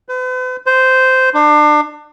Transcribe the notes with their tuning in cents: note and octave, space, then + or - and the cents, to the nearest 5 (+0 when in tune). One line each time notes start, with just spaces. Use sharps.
B4 +45
C5 -10
D4 +30